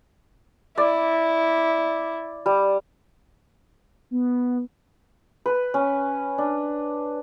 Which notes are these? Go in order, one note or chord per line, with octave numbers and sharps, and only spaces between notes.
E4 D5
G3
B3
B4
C#4
D4